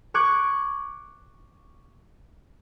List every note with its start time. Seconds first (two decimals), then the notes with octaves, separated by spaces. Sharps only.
0.14 C#6 D6 F#6 G#6